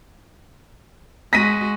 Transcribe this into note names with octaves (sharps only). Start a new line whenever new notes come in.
G#3 F#4 A#6 B6 D#7